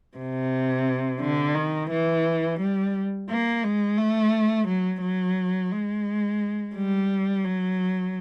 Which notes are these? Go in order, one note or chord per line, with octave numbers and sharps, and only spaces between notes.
C3
D3
D#3
E3
G3
A#3
G#3
A3
F#3
F#3
G#3
G3
F#3